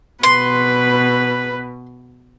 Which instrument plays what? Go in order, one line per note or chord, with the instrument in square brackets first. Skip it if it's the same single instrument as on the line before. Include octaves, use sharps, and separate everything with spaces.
[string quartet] B2 [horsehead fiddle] B4 [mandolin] C6